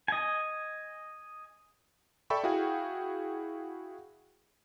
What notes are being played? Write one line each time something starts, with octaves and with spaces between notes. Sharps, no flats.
D#5 G#5
A4 D5 E5 G5 B5 C#6
E4 F#4 G#4 F5 G5